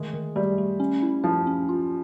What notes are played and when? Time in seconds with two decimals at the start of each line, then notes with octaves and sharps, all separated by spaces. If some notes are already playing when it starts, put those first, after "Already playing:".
Already playing: D#3 G#3 A3
0.14 D#3
0.36 G3 A3
0.58 A3
0.80 C#4
1.02 E4
1.23 F3 E4
1.47 C#4
1.69 F4